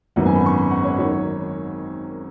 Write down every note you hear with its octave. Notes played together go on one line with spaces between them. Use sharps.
G#1 F#2 F#3 B3 F#5
G#5
B5
C#6
B5
F#5
C#5
D#3 F#3 C#5